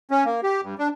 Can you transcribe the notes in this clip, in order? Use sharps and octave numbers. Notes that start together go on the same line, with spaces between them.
C#4
A#3
G4
G2
D4